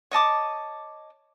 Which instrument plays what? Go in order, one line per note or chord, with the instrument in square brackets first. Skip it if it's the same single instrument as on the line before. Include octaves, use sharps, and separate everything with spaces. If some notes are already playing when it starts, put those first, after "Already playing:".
[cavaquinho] C#5 D#5 A5 D6